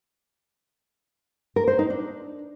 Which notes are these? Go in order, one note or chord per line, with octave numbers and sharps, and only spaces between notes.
A#4
C5
D#4
D4